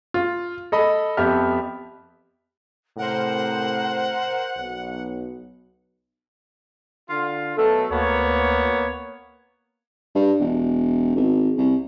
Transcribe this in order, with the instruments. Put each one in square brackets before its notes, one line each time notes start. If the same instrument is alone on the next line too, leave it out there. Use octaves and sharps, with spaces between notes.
[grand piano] F4
A4 D#5 B5
F2 B3 G4 E5 F6
[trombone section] A2 C3 [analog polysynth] A#4 C5 [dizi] F#5
[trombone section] B1
[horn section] D3 F4
[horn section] B2 F#3 A3 [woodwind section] A4
[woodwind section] D2 [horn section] A#3 B3 C#5
[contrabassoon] G2
E1
G#1
C2